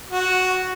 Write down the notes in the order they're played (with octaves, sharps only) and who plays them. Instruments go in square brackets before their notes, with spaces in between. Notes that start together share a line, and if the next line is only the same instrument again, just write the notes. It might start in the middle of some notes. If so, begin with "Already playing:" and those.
[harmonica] F#4